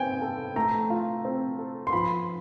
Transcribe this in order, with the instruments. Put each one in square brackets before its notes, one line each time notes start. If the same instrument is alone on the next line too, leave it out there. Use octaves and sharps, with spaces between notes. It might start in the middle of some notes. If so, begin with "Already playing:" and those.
Already playing: [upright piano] C4 [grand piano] G5 G#5
[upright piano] A4
[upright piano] A3 [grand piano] A#5
[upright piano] F4
C4
A4
[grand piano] C6
[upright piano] F3 [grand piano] B5